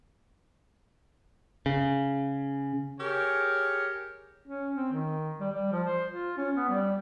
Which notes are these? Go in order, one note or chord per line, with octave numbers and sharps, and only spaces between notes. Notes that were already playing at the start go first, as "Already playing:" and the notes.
C#3
G4 G#4 A#4 C#5
C#4
C4
D#3
G3
G3
F3
C5
F4
C#4
B3
G3